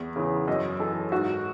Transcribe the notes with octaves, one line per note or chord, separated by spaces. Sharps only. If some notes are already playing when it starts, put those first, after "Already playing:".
Already playing: E2
C#3 E3
F#2 D#5
E3 A4
G#2 F#4